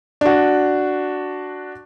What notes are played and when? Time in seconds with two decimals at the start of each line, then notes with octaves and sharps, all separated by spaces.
0.21 D4 F#4